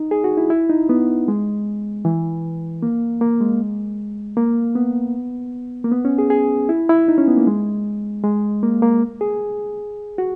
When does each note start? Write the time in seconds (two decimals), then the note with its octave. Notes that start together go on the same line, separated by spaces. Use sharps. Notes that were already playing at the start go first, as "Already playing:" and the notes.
Already playing: D#4
0.11 G#4
0.24 F#4
0.37 E4
0.50 E4
0.69 D#4
0.89 B3
1.28 G#3
2.05 E3
2.82 A#3
3.21 A#3
3.40 G#3
4.37 A#3
4.75 B3
5.84 A#3
5.92 B3
6.05 C#4
6.18 G#4
6.30 G#4
6.69 E4
6.89 E4
7.08 D#4
7.18 C#4
7.28 B3
7.37 A#3
7.47 G#3
8.24 G#3
8.63 A#3
8.82 A#3
9.21 G#4
10.18 F#4